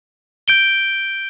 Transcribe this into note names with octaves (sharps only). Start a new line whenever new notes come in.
G6 D7 G7